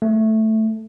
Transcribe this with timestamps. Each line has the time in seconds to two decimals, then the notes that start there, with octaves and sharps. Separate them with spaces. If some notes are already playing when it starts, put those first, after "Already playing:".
0.02 A3